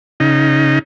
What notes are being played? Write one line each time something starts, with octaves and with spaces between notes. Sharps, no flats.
C#3 D#4